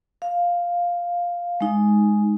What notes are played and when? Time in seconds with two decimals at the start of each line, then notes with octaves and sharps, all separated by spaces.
0.22 F5
1.61 G#3 D#4